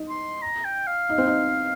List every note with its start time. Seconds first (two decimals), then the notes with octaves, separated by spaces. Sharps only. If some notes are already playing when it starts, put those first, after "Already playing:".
Already playing: D#4
0.09 C6
0.42 A#5
0.65 G5
0.87 F5
1.09 D#4
1.18 C4
1.26 D#4